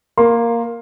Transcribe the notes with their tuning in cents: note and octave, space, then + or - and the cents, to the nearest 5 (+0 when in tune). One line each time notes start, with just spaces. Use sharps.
A#3 +0 C6 +15